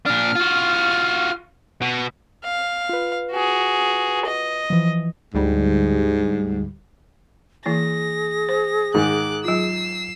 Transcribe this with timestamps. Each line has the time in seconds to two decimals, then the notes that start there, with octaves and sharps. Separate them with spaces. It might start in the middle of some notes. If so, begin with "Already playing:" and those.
0.06 A#2 D4 F6
0.36 F4 F#4
1.82 B2
2.44 F5
2.89 F4 B4
3.31 F#4 G#4
4.26 D#5
4.70 E3 F3
5.34 D2 G#2 G3
7.66 E3 A#3 E4 G#4 A#6
8.49 C5
8.94 G#2 D#3 D6 F#6
9.44 F#3 F4 E6 C7